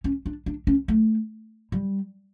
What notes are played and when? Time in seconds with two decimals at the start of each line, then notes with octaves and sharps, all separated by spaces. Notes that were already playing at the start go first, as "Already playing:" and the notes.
0.04 C#4
0.26 D4
0.46 D4
0.67 C#4
0.88 A3
1.72 G3